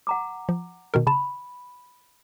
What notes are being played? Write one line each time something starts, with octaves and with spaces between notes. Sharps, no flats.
F#5 A#5 D6
F3
B2 D#3 A#4
C#3 A5 B5 E7